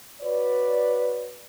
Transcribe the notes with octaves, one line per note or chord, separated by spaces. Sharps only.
F#4 B4 C#5 D5